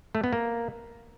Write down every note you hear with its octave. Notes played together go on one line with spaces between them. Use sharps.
A3
B3
A#3